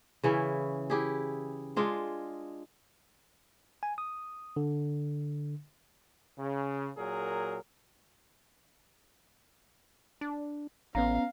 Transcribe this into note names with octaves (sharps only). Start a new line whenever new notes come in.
C#3 E3 C#4 E4
E4 G4 G#4
G#3 D4 F4 G#4
G#5
D#6
D3
C#3
A#2 F#3 G#4 A#4
D4
A1 B3 C#4 F5 A#5